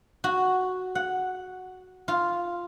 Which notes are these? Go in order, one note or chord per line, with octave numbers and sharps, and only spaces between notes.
F#4
F#5
F4